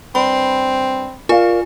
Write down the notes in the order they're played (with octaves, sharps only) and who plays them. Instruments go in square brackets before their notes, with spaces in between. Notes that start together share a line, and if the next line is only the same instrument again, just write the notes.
[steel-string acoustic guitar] G2 [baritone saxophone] C4 [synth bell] B5
[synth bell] F4 G#5 [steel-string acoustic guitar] A#4 D5 F5